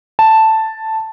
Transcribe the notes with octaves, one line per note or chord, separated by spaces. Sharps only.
A5